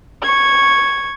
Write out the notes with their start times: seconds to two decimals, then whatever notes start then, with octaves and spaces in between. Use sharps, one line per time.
0.22 C#6 G#6